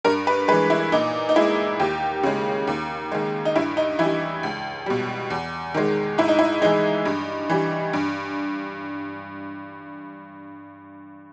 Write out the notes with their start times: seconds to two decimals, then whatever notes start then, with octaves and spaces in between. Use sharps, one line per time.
0.05 G2 A#4
0.27 B4
0.48 G#3 B4
0.52 E3
0.70 E4
0.92 A#2 D#4
1.29 D#4
1.36 G#3 E4
1.80 D#2 G4
2.23 C#3 G#3
2.67 D#2
3.12 D#3 G#3
3.45 D#4
3.56 G2 E4
3.77 D#4
3.99 E3 E4
4.03 G3
4.43 C#2
4.86 B2 G3
5.30 E2
5.74 D#3 G#3
6.18 G#2 E4
6.28 D#4
6.39 E4
6.62 E3 G#3 D#4
7.05 G2
7.50 E3 G3
7.93 G2